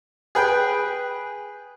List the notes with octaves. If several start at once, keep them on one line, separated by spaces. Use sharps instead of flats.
G#4 B4 G5